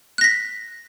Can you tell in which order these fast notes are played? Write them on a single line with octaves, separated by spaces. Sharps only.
F#6 A#6 B6